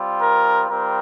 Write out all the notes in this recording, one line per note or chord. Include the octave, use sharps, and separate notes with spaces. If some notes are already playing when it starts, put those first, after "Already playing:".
Already playing: G3 C4 F4
A#4
G3 C4 F4 A#4